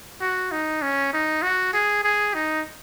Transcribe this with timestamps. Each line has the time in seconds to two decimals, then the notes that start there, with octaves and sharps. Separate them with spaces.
0.21 F#4
0.51 D#4
0.82 C#4
1.13 D#4
1.42 F#4
1.73 G#4
2.04 G#4
2.34 D#4